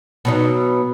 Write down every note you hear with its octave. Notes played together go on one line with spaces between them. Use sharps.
B2 F#3 D#4